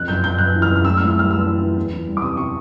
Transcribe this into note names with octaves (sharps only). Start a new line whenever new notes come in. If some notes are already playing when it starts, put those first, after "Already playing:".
Already playing: F2 F#6
F#1 G6
F#1 G6
F#1 F#6
E3
F6
F#1
F6
A2 E6
A2 F6
E6
G3 F6
G3 E6
E3
E3
E2
E3
G3
D6
C3 D#6
C3 C#6